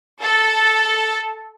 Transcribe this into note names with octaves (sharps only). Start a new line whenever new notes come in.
A4